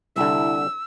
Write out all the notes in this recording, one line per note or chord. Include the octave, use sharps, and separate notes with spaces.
C2 D3 E4 E6